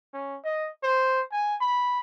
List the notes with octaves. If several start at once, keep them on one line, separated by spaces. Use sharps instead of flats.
C#4
D#5
C5
G#5
B5